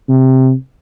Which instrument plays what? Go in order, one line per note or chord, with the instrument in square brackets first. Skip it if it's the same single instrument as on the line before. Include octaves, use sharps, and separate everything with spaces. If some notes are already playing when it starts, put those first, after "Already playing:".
[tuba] C3